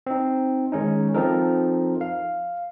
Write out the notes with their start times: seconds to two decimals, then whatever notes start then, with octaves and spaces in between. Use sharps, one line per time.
0.07 C4 D#4
0.72 D#3 G#3 C#4 D#4
1.14 F3 C4 D#4 A4 A#4
2.01 F5